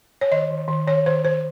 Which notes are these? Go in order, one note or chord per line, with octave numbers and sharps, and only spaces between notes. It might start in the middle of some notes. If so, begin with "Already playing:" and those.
C#5
D#3 D#5
D#3
D#3
D#3 C#5
D#3 C5
D#3 C5